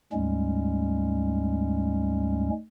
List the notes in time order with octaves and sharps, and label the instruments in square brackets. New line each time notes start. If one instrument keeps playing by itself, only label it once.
[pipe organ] D2 G#2 G3 G#3 C#4